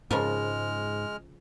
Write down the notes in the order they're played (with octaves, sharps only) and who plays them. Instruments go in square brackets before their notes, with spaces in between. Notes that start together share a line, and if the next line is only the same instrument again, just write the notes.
[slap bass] G#2 [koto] C#3 F3 A#4 [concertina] G#3 F6